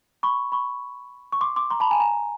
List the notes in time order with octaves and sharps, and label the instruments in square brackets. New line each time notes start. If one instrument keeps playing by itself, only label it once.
[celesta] B5 C#6
B5 C#6
C#6
C6 D6
C6 D6
A#5 C6
A5 B5
G#5 A#5
G#5 A#5